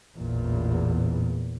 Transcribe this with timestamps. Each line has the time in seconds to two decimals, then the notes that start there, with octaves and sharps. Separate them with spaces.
0.16 A1 E2 A#2